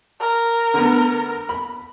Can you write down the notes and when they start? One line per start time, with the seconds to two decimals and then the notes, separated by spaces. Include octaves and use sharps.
0.20 A#4
0.74 D3 A3 B3
1.49 B5